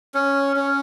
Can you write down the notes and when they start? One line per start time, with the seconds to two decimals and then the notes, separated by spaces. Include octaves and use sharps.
0.15 C#4
0.56 C#4